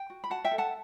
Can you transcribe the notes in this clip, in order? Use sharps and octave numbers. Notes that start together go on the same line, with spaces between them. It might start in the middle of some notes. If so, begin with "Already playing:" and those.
Already playing: G5
F#4
B5
F#4 F#5 A5
E5 G5
A4
F#5 A5